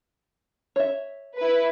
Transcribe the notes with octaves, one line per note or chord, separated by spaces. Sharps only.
C#5 E5
E4 B4